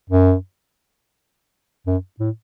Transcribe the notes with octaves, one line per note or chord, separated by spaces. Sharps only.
F#2
F#2
A2